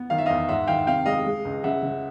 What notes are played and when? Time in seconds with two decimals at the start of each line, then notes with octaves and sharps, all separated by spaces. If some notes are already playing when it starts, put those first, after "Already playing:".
Already playing: B3
0.10 D#3 F5
0.18 E5
0.26 E2 D#5 F5
0.49 G#2 E5 F#5
0.67 D#3 F5 G5
0.87 C3 F5 G5
1.06 G#3 D#5 F5
1.26 G#3
1.45 C#2
1.64 C#3 E5 F#5
1.83 C#3